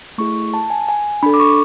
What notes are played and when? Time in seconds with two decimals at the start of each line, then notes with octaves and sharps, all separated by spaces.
0.18 A3 E4 G#4 C#6
0.54 A5
0.70 G#5
0.89 G#5
1.23 D4 A4 B5
1.34 D6
1.40 C#6